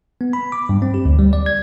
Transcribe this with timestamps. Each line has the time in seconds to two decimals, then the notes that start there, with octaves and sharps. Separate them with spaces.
0.21 B3
0.33 B5
0.52 D6
0.69 G2
0.82 C4
0.94 G4
1.05 D2
1.19 G3
1.33 D5
1.46 G#6